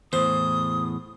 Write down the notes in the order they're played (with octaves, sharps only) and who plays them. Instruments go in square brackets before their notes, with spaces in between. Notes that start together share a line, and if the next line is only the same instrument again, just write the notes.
[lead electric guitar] E2 A2 [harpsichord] C5 [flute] D#6